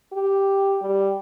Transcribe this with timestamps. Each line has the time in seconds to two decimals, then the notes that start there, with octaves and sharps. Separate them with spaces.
0.13 G4
0.82 G3